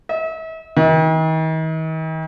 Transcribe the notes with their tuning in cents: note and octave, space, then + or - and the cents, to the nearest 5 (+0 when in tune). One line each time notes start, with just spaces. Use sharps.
E5 -40
D#3 +45